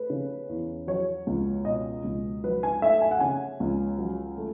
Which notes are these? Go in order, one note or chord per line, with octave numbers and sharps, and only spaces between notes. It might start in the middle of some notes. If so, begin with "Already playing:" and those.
Already playing: A3 B4
C#3
E2
F#3 C#5
C#2
B2 D#5
C#2
F#3 B4
G#5
A3 E5
G#5
F#5
C#3 G#5
C#2
F#3
A3